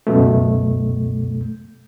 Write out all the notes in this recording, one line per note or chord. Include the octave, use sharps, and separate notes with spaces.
C#2 F#2 B2 A3